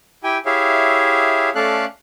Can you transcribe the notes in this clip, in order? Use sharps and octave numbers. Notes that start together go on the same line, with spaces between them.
E4 G4 G5 G#5
E4 G4 G#4 C#5 E5 F5
A3 C#4 A4 D5 F5 F#6